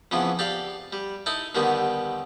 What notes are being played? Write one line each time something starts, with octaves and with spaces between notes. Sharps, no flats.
F2 C#3 E3 B3
G4 A4 D5 F5
G3
D#4 E4 A4
D#2 D3 D#3 G3 B3